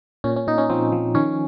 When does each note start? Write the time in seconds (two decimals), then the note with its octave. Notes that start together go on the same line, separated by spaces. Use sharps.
0.24 A#2 C#4
0.36 C#4
0.47 A#2 D#4
0.58 C#4
0.70 F3 C4
0.92 F3
1.15 D#3 C#4